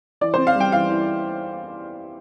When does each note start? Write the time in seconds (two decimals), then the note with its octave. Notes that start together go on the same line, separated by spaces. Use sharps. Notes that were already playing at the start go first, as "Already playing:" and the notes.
0.21 E3 D5
0.34 C4 C5
0.47 F5
0.56 G3 G5
0.72 E3 F5
0.90 E3